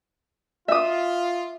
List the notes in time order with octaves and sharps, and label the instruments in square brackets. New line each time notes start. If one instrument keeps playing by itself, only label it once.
[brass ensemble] F4 [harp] E5 D#6